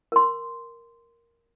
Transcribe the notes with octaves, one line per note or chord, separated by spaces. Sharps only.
A#4 C6